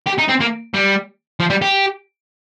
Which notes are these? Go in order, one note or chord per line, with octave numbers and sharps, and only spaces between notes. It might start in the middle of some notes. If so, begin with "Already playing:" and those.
G4
D#4
C4
A#3
G3
F3
G3
G4